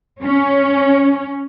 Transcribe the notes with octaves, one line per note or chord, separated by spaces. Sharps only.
C#4